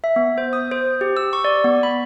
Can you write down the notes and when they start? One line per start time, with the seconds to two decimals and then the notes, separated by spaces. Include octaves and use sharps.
0.04 E5
0.16 B3
0.38 C5
0.53 D#6
0.71 C5
1.01 G4
1.17 E6
1.33 C#6
1.45 D5
1.64 B3
1.83 B5